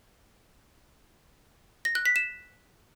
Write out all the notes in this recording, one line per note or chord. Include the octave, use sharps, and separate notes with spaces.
A#6
F#6
B6
E7